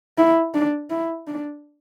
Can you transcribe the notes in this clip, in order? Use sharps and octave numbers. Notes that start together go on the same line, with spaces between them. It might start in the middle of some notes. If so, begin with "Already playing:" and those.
E4
D4
E4
D4